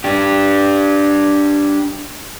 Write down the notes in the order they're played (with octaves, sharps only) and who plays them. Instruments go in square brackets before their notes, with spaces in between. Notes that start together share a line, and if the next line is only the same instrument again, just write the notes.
[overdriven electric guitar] D4 G4